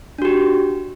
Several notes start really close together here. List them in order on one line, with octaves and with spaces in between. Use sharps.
D4 F#4 G4